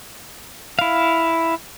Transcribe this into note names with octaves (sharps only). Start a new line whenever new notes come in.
E4 F5